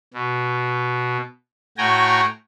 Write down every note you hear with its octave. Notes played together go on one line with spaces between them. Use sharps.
B2
A2 F#4 G5 G#5 A#5